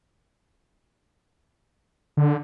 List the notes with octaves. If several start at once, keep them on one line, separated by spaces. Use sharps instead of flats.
D3